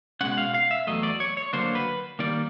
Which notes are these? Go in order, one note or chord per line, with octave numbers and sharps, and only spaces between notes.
B2 G#3 C#4 F#5
F5
F5
E5
E2 B2 F#3 A3 D#5
D5
C#5
C#5
D3 F#3 A#3 D4 C5
B4
D#3 G3 A#3 D5